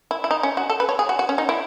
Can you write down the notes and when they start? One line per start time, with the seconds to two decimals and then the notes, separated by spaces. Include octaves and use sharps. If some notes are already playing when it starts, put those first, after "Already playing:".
0.11 E4
0.24 E4
0.31 D#4
0.43 C#4
0.57 F#4
0.70 A4
0.80 B4
0.89 C#5
0.99 G#4
1.09 F#4
1.19 F#4
1.29 C#4
1.38 D#4
1.49 E4